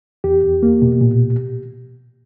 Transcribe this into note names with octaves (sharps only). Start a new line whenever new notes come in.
E2 G4
E2
A#3
B2
A#2